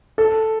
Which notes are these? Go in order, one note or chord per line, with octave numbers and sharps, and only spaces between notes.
A4